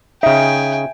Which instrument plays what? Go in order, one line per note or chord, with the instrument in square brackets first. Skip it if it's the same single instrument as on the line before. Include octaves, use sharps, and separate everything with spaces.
[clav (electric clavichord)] C#3 D#4 [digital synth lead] E5 [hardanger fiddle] G5 G#5